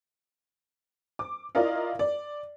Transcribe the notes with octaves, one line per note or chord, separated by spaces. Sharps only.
D6
E4 F4 A#4 D5 D#5 F5
D5